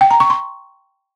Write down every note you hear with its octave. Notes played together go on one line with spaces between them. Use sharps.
G5
A#5
C#6
C6